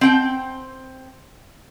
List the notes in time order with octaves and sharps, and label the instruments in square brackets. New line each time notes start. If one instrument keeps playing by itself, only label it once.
[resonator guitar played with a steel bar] C4 G5